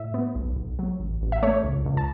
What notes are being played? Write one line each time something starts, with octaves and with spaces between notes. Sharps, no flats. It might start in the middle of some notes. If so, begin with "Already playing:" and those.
Already playing: A2 E5
B3
B1
B1
F#3
A1
A1
E5
A3 C#5
C#2
C#2
A5